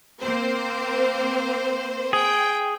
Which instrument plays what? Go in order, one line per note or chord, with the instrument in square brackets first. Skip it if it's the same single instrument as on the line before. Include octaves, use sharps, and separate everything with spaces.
[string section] A#3 C4 C5
[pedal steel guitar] G#4 [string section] G5